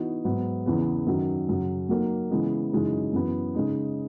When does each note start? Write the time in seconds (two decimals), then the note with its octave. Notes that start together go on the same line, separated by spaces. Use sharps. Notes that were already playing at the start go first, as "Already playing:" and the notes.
Already playing: E3 B3 D#4 F#4
0.24 G#2 F#3 B3
0.66 E2 C#3 E3 B3
1.06 F#2 D#3 F#3
1.49 F#2 C#3 F#3
1.89 F#3 A#3 D#4
2.31 C#3 E3 G#3 B3
2.73 F#2 C#3 E3 G#3 D#4
3.13 F#2 E3 B3
3.55 C#3 G#3 D#4